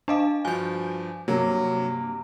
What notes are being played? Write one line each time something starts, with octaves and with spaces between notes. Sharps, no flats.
D4 D#5 F5 A5 D6
G2 F3 F#4 G#5 G6
G2 C3 F#3 A#3